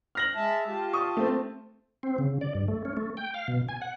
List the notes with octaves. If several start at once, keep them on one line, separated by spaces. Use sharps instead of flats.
F6 A#6 F#7
G#3 E5 A5
F4 G4 A5
C#6 D#6
A3 C4
C4
C#3
D5
G2
A3
C#4
A3
G5
F5
B2
G#5
F#5